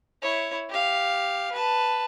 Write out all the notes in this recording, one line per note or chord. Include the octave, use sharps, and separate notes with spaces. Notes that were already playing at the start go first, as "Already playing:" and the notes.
E4 C#5
G4 F5
B4 A5